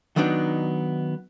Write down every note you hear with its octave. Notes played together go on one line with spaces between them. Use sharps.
D#3 F#3 B3 D4 D#4